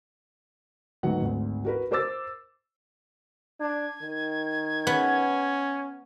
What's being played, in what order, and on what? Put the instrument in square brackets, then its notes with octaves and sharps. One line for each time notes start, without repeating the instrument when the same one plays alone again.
[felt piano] D2 G#2 D#3 F#3 B3 F#5
G#1 D2
F#4 A#4 B4
A#4 C5 D6 E6 A6
[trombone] D4 [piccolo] G#6
[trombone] D#3
[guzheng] B3 [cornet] C#4